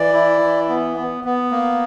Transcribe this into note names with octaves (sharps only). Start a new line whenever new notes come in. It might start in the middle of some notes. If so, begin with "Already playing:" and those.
Already playing: E3 D5
E4
E3
B3
B3
B3
A#3